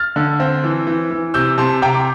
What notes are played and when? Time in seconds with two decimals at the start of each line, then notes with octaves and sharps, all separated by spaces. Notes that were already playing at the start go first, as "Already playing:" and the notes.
Already playing: F6 A6
0.16 D3
0.40 C4
0.64 E3
0.87 E3
1.11 E3
1.34 C3 E6 G6
1.58 C3 A5 C6
1.82 C3 G5 A#5
1.94 D6